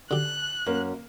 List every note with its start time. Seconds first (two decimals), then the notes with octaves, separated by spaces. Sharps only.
0.11 D3 G4 F#6
0.66 F#2 A#3